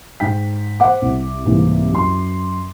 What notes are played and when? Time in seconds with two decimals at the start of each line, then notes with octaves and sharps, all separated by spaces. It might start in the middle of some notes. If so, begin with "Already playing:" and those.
0.20 G#2 G5 B6
0.80 C5 F#5 D6
1.02 C2
1.46 C2 G#2 E3 A#3
1.91 F#2 C6